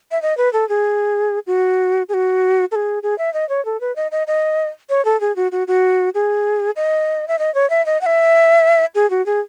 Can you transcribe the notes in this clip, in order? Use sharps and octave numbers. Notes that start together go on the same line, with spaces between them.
E5
D#5
B4
A4
G#4
F#4
G#4
F#4
A4
G#4
G#4
E5
D#5
C#5
A4
B4
D#5
D#5
D#5
C#5
A4
G#4
F#4
F#4
F#4
G#4
D#5
E5
D#5
C#5
E5
D#5
F#5
E5
G#4
F#4
G#4